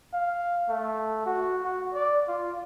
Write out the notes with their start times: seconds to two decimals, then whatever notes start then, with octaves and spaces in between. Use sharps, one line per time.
0.13 F5
0.69 A3
1.26 F#4
1.63 F#4
1.94 D5
2.28 F4